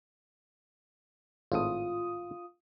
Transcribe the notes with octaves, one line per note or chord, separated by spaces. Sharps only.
G#1 A2 F4 D#6